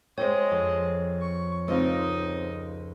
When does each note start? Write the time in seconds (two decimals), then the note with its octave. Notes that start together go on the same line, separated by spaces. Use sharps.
0.18 G#3 C5 C#5 D#5 G5
0.51 F2
1.21 C#6
1.68 C#2 C4 D#4 F4 D#5 F5